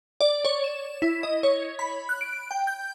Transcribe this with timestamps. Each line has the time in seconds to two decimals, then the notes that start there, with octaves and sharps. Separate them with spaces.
0.21 D5
0.45 C#5
0.64 E7
1.02 E4
1.23 D#5
1.43 C#5
1.79 B5
2.09 F#6
2.21 D7
2.51 G5
2.67 G6